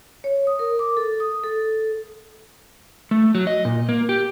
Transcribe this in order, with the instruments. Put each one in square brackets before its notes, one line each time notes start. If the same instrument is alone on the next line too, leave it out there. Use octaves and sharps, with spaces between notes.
[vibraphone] C#5
D#6
A#4
D6
A4
D#6
A4
[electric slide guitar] A3
F#3
D#5
A#2
A#3
G4